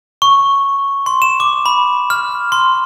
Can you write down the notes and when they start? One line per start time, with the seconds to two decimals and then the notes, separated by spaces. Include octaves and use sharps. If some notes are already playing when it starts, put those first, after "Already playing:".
0.22 C#6
1.06 C6
1.22 E7
1.40 D6
1.66 B5
2.10 F6
2.52 C6